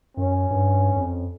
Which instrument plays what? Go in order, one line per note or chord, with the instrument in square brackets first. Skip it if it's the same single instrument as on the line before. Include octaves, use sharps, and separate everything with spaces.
[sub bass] F#2 [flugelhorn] C#4
[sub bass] G2
F2